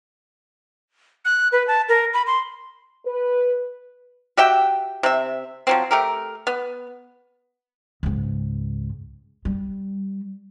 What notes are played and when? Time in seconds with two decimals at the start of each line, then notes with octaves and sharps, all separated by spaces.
1.25 F#6
1.52 B4
1.68 A5
1.89 A#4
2.14 B5
2.27 C6
3.06 B4
4.37 F#4 G4 E5 G5
5.03 C3 E5
5.67 F3 F#3 C4
5.91 A3 G4 A#4
6.47 B3
8.03 C#2 G#2
9.45 G3